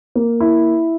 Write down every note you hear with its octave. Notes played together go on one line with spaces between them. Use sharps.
A#3
E4